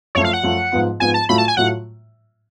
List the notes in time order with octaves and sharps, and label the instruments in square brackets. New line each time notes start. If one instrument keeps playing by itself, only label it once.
[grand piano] F#2 F3 A3 F4 [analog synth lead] C#5
[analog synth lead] F5
F#5
[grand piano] F#2 F3 A3 F4
G#2 F3 B3 F4
[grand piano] G#2 F3 B3 F4 [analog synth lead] G#5
[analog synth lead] A5
[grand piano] A2 F#3 A3 F4 [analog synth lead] B5
[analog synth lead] A5
G#5
[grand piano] A2 F#3 A3 F4 [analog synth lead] F#5